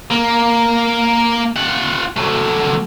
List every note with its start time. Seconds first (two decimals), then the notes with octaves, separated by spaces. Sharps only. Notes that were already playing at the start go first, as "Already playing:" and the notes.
0.11 A#3
1.57 F4 F#5
2.17 F#3 A3